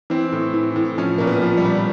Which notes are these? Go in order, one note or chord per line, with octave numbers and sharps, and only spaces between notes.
E3 C4
A2
E3
A2
F3 C#4
A#2 A#3
B3
F3
G3
A#2